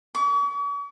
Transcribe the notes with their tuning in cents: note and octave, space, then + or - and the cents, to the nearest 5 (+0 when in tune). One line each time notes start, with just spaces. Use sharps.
C#6 +45